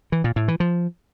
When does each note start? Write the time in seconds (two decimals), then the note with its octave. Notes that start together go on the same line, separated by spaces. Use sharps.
0.12 E3
0.24 A#2
0.36 A2
0.48 E3
0.60 F3